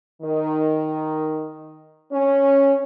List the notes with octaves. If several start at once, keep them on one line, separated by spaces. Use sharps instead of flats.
D#3
C#4